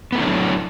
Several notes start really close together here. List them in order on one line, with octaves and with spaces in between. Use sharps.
B3 A3 E4 D4 F#3